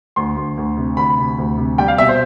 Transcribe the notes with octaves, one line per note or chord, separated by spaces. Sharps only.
D2 C6
D2
D2
C3
D2 B5
C3
D2
C3
G3 G5
F5
B2 E5
C5